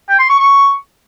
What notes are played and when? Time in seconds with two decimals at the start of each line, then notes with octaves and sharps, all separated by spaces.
0.09 G5
0.19 C6
0.29 C#6
0.39 C#6